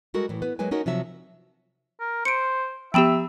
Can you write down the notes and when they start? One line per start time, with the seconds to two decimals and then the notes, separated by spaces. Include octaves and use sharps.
0.14 G3 G#3 F#4 A4 A#4
0.29 A2 E3
0.42 B3 B4
0.59 F#3 G#3 A#3 B4 G#5
0.71 C#4 D#4 F#4 A#4 C#5
0.86 C3 F3 F#3 E5
2.00 A#4
2.25 C5 C#7 D7
2.94 F3 B3 G4 E5 G5 B5 E7